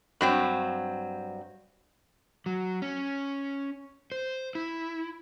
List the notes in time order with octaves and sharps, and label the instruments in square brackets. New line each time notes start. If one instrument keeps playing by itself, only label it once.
[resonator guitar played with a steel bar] G2 F#3 C4
[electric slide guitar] F#3
C#4
C5
E4